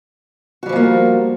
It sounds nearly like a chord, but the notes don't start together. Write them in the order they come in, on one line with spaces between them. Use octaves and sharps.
F#4 G3 F3 G#3 A#3